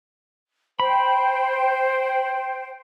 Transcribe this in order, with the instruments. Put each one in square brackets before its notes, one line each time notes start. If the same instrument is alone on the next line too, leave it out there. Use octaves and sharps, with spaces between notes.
[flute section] C5 G5 [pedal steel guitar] B5